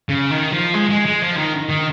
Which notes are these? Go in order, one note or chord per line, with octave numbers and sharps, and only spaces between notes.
C#3
D#3
F3
G#3
G#3
G#3
F3
D#3
D#3